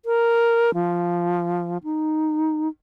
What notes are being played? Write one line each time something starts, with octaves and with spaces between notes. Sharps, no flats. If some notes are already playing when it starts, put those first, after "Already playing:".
A#4
F3
D#4